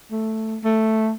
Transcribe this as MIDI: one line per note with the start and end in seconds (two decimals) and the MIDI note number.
0.11 0.57 57
0.64 1.12 57